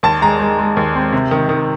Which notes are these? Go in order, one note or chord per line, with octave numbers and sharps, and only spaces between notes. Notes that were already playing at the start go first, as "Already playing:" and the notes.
D#2 A5
G#3 A#5
G#3
G#3
D#2
C4
C3
D#3
D#3